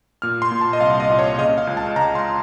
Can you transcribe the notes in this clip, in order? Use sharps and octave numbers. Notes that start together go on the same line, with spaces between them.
A#2 F6
C6
A#2
A5
D#5
C2 F5
D#5
A#2
C#5
C#3 D#5
F5
C#2
A5
C#2 A#5
C6